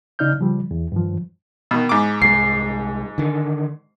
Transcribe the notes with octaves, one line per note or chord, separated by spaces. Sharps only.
C#3 D#4 D5 F6 G6
C#3 F3 G3
E2
G2 D#3 F3
B2 D#3
G#2 D6
C2 G#3 C7
D3 D#3